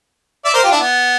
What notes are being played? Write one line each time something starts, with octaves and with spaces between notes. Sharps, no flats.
D5 E5
A#4 C5
F4 G4
D4 E4
B3